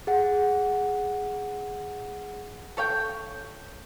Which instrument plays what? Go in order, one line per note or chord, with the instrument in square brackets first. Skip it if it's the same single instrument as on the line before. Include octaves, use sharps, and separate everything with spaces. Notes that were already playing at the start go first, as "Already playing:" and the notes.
[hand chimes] G#4 F#5
[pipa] A4 C#5 F5 G5